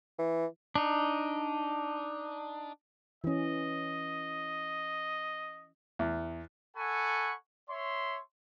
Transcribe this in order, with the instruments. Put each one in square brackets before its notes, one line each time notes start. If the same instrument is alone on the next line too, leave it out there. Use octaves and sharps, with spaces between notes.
[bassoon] E3
[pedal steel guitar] D4 D#4
[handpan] E3 C#4 [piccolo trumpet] D#5
[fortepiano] E2
[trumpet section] A4 F#5 G#5 B5 C#6
C#5 E5 C6